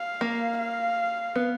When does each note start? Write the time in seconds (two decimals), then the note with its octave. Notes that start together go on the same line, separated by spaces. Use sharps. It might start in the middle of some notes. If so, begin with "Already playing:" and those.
Already playing: F5
0.21 A#3
0.59 F5
1.36 B3